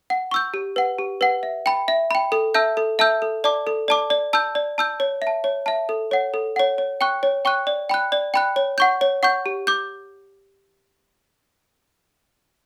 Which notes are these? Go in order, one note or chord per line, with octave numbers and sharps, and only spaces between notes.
F#5
C#6 E6 G6
G4
B4 F#5
G4
B4 F#5
E5
G5 B5
E5
G5 B5
A4
E5 A5 E6 G6
A4
E5 A5 E6 G6
A4
D5 A5 D6
A4
D5 A5 D6
D5
A5 E6 G6
D5
A5 E6 G6
C#5
E5
A5
C#5
E5 A5
A4
C#5 F#5
A4
C#5 F#5
C#5
G5 C#6 F#6
C#5
G5 C#6 F#6
D5
G5 B5 F#6
D5
G5 B5 F#6
C#5
F#5 C#6 G6
C#5
F#5 C#6 G6
G4
D6 G6